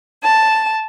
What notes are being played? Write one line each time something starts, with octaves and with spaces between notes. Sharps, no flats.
A5